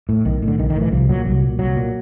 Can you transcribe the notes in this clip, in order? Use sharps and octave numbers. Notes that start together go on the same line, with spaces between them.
A2
B1 D#3
A2
D3
B1 D#3
D#3
A2
E3
C2 F3
A#2 F#3
C2 F#3
A#2
C2 F#3
A#2